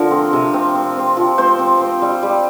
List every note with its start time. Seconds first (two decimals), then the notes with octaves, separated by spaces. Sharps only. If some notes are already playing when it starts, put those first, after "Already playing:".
Already playing: D3 F3 A#4
0.11 C4
0.33 C3
0.54 C4
0.75 C4
0.97 C4
1.17 F3
1.38 C4 C5
1.59 C4
1.81 C4
2.02 G3
2.23 G3